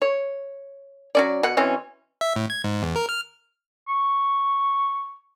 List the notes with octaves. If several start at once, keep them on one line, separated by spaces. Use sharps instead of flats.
C#5
F#3 C#4 D5
B2 F#5
B2 E3 C4 C#4
E5
A2
G#6
G#2
E2
A#4
F6
C#6